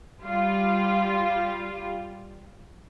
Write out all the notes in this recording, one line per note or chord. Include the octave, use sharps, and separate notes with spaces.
G3 F4